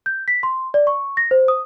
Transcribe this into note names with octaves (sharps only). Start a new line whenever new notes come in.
G6
B6
C6
D5
C#6
A#6
C5
D#6